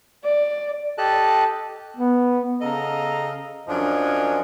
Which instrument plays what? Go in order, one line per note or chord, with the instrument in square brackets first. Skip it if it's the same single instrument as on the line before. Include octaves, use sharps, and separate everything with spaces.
[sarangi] D5
[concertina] G4 A4 D#5 A5 F#6
[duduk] B3
[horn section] C#3 A4 D#5 F5 A#5
F#2 F3 D4 C#5 D#5 G#5